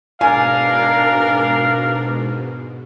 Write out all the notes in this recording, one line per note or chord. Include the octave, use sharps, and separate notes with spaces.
G#2 B2 D4 A#4 F5 G#5